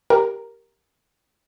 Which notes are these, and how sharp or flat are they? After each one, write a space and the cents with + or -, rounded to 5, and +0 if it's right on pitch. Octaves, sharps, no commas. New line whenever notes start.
G4 +0 A#4 +0